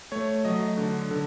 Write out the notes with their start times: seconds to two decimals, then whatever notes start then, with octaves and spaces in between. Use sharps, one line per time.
0.12 A3 C#5
0.45 F#3 D#5
0.77 D3
1.11 D3